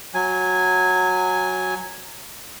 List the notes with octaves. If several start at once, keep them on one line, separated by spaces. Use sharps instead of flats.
F#3 G#5